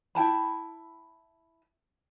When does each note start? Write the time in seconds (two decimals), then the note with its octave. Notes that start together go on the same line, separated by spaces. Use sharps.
0.15 E4 G5 A5 B5